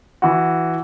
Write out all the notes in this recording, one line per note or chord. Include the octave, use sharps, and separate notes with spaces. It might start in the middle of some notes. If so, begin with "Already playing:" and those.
E3 F#4